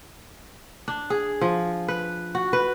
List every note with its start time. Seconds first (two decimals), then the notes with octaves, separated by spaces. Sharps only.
0.88 D4
1.10 G#4
1.41 F3
1.88 B4
2.35 F#4
2.53 B4